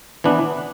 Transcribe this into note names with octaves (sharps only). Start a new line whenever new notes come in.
E3 B3 D4